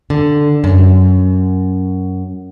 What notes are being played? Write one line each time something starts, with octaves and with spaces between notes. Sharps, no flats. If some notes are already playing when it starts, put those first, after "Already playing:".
D3
F#2